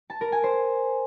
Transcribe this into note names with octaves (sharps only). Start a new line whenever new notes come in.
A5
A#4
G#5
C5